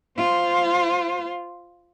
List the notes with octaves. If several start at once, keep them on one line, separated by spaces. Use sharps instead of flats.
F4 C5